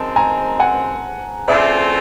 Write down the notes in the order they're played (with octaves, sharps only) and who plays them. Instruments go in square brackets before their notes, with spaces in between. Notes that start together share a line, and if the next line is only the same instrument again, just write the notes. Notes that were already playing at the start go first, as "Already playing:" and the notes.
Already playing: [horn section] F#2 D#3 G#3 C4 [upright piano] A5
[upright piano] G#5 A#5
F#5 G#5
[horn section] C#3 E3 A3 C4 F4 [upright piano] D5 E5